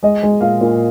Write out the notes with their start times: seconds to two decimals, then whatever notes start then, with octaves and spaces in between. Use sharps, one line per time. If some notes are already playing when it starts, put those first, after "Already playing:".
0.03 G#3 D#5
0.23 G#3
0.41 A#2 F5
0.61 A#2